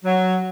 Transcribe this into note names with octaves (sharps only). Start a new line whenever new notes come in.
F#3